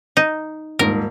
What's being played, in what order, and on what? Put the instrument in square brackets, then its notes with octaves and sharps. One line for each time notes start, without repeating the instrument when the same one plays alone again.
[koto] D#4
[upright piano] D#1 G#2 [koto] A#4